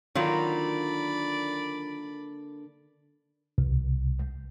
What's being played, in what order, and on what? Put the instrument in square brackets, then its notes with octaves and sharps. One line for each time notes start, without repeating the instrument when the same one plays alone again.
[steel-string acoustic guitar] D3 A#3 D4 [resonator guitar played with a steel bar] D#3 F#3 F4 [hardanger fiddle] D5 B5
[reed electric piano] C2